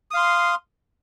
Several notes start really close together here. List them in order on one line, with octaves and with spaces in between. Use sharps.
D#6 F5 C6